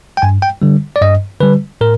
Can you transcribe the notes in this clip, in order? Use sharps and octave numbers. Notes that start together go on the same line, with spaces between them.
G5
G2 G#5
G5
D3 G3
D5
G2 D#5
D3 G3 B4
A2 A#4